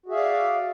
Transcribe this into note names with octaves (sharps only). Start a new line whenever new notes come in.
F#4 G#4 D5 E5 F5